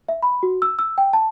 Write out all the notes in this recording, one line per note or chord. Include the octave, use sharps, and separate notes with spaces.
E5
B5
F#4
E6
E6
G5
A5